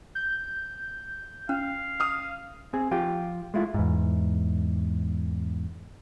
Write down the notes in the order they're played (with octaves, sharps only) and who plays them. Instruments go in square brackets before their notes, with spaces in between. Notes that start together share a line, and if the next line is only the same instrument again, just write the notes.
[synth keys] G6
[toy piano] C#4 [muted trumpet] F5
[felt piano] D#6 F6
[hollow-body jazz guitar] C4 G#4
F3 F4 G4
G#3 A3 E4 F4
[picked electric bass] E2 G#2